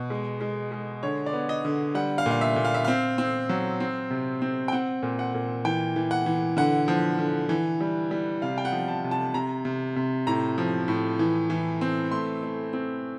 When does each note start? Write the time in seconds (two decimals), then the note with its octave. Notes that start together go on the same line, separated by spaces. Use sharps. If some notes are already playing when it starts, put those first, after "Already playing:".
Already playing: B2
0.10 G#3
0.41 G#3
0.72 G#3
1.03 D3 C#5
1.26 D5
1.33 B3
1.49 D#5
1.65 D3
1.95 G3 F#5
2.18 F5
2.26 A#2
2.31 F5
2.41 E5
2.56 A#2
2.65 F5
2.74 E5
2.84 C4 F5
3.18 C4
3.49 F#3
3.80 C4
4.10 C3
4.42 C4
4.68 G5
4.72 C4 F#5
5.03 A#2
5.19 F#5
5.34 A#2
5.65 E3 G5
5.96 E3
6.11 F#5
6.26 E3
6.57 D3 F#5
6.88 F3
7.19 D3
7.49 E3
7.81 G3
8.11 G3
8.42 C3 F5
8.58 G5
8.65 F#5
8.72 F3
8.88 A5
9.04 C3
9.11 A5
9.34 C3 A#5
9.65 C3
9.96 C3
10.27 A2 A#5
10.58 F3
10.88 A2
11.19 E3
11.50 E3
11.81 C4
12.11 A3 C6
12.43 A3
12.73 C4